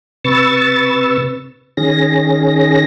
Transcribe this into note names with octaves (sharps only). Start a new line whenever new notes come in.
C3 B4 C#6 E6 A6
D#3 C#4 G#4 A#6